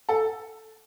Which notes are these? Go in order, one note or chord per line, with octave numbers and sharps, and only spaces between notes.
A4